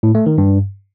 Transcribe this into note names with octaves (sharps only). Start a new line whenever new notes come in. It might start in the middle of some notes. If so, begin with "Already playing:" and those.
A2
A3
D#3
G2